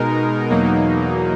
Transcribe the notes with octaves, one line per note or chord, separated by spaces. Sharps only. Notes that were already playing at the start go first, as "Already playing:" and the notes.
Already playing: B2 G#3 D#4 A#4
E2 B2 F#3 A#3 D#4